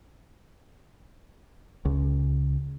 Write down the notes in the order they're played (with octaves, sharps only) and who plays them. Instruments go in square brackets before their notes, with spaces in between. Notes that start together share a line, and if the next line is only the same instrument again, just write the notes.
[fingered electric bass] C#2